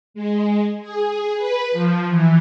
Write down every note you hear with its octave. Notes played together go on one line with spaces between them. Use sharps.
G#3
G#4
B4
F3
E3